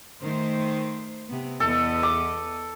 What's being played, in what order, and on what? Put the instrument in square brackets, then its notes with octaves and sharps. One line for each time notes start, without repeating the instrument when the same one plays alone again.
[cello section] D#3 A3 C5
C3 B3
[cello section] E2 B3 D#5 [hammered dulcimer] A4
[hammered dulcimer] D6